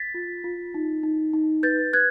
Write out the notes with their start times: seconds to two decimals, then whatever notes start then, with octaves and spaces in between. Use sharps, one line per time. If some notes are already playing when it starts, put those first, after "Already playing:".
Already playing: A6 B6
0.14 F4
0.44 F4
0.74 D#4
1.03 D#4
1.34 D#4
1.63 B4 G6 A6
1.93 B4 F#6 G#6